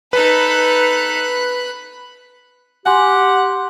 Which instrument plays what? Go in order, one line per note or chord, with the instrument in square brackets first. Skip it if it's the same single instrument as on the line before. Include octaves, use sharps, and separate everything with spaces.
[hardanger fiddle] D#4 A4 [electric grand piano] B4 [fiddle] B5 F#6
[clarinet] G4 [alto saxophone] F#5 [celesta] G#5 C6